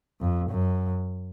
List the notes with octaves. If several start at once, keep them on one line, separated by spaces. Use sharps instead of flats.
F2
F#2